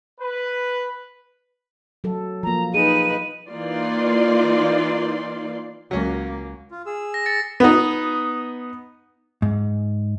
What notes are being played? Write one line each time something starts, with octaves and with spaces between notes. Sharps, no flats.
B4
F#3 A4
F3 A#3 A#5
D#4 G#4 B4 D#7
E3 A#3 D#4 F4 D5 C6
C#2 F#3 A#3 C#4
F4
G#4 E6
A#6
A6 A#6 C#7
B3 D#4
G#2